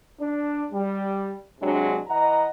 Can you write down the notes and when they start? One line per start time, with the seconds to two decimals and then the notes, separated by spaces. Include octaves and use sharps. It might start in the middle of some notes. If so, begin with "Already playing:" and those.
0.21 D4
0.72 G3
1.61 C3 F#3 G#3 D4
2.08 E3 D#5 F#5 A#5